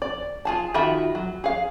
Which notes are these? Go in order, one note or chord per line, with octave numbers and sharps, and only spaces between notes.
D5
F4 G#4 A5
D#3 F4 F#4 E5 B5
F#3
G#4 F5